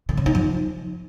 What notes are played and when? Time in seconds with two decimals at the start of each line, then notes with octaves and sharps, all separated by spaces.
0.09 D3
0.17 C#3
0.26 D#4
0.35 F3